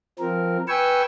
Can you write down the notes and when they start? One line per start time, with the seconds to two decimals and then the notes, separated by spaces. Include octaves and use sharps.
0.19 F3 C4 A#4
0.68 B4 G5 G#5 C#6 E6